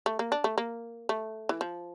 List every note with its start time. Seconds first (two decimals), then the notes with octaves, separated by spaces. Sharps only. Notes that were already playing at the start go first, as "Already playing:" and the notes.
0.06 A3
0.19 A#3
0.32 D4
0.44 A3
0.58 A#3
1.09 A3
1.49 E3
1.61 F3